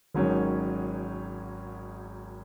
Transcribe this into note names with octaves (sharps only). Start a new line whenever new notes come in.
G#1 G#2 D#3 F#3 C#4